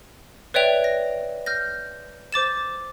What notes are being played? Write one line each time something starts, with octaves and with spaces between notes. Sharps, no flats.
B4 C#5 D5 E5 G5 F7
A#6
F6 G6 A#6
C5 D6 A6 E7